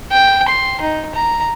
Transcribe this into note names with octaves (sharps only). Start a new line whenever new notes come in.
G5
C6
D#4
A#5